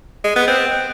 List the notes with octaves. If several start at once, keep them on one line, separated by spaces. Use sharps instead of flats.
G#3
B3
C4